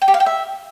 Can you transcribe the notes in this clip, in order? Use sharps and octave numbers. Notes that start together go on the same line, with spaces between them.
G5
G4
F5
G5
E5